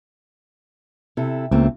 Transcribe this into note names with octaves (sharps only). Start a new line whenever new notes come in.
C3 E4 A4
C#2 A3 A#3 C4